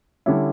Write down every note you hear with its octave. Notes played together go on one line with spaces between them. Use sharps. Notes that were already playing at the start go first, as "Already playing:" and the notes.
D3 G3 C#4 E4